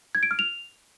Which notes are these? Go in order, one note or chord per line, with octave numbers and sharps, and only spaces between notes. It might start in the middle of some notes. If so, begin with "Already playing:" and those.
G#6
D7
F6
F7